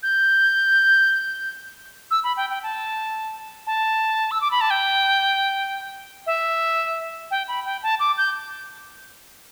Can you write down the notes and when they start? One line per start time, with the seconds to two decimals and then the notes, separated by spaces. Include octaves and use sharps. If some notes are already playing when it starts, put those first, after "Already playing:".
0.03 G6
2.11 E6
2.24 B5
2.37 G5
2.50 G5
2.63 A5
3.67 A5
4.31 E6
4.41 D6
4.51 B5
4.61 A5
4.70 G5
6.26 E5
7.31 G5
7.48 B5
7.65 G5
7.83 A5
8.00 D6
8.18 G6